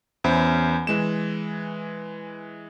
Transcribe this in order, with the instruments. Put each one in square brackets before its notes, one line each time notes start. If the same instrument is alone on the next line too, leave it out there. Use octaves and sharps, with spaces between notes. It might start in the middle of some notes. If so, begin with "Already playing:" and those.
[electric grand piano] E2 C#4 C5 E5 B5
E3 G#3 E7